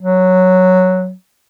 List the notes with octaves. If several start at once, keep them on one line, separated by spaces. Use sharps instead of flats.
F#3